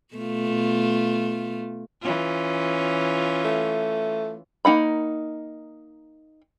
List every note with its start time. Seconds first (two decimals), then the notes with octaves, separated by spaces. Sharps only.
0.15 B2 A3 F4
2.02 E3 C#4 F4
3.45 A3
4.65 A#3 D#4 F#5 B5